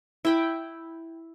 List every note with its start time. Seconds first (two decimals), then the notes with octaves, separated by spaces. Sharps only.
0.25 E4 G5 B5